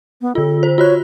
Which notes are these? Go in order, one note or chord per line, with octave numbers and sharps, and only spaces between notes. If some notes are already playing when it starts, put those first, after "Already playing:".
B3
D3 F4 A4
C5
F4 F#4 C#5 F#6